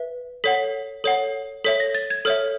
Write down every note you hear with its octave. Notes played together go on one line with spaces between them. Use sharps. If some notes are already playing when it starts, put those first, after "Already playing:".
Already playing: B4 E5
A4 C#5 F#5 B6
A4 C#5 F#5
A4 C#5 E5 B6
A#6
A6
G#6
A4 C#5 E5 F6